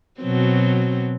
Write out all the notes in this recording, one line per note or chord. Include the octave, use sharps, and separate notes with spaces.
B2 F#3 C4